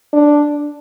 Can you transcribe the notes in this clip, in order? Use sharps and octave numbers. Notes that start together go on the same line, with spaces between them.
D4